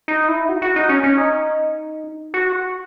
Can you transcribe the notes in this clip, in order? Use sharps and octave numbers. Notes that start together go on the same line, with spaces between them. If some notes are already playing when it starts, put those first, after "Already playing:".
D#4
E4
F#4
F#4
D#4
C#4
C#4
D#4
F#4